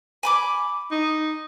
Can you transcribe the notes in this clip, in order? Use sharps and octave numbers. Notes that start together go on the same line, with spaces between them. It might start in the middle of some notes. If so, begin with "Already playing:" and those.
G#5 B5 D6
D#4